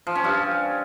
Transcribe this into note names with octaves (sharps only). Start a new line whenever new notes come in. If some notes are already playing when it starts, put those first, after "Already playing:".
F3
C#4
G2